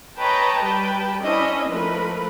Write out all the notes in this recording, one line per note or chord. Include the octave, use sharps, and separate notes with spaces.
B4 C#5 D#5 G5 A5 A#5
G3 B4 G5 A5
C#4 D4 E4 C5 D#5 E5
F3 A3 A#4 B4